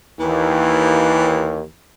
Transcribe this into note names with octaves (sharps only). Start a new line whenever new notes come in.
D#2 E3